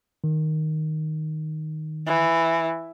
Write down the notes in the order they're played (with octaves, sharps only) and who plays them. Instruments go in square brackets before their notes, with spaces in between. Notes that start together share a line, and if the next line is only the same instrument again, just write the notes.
[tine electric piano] D#3
[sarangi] E3